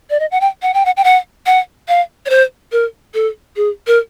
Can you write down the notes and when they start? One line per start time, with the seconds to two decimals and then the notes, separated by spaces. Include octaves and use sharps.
0.10 D5
0.20 D#5
0.31 F#5
0.41 G5
0.62 F#5
0.74 G5
0.85 F#5
0.97 G5
1.04 F#5
1.46 F#5
1.88 F5
2.26 C#5
2.30 C5
2.72 A#4
3.14 A4
3.56 G#4
3.87 A#4